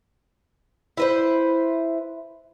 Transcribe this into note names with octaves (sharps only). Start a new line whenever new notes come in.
E4 B4 C5